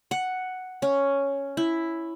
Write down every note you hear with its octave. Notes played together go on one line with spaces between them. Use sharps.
F#5
C#4
E4